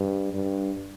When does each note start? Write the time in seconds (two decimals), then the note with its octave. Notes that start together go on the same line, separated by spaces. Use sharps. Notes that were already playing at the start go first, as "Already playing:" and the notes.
Already playing: G2
0.33 G2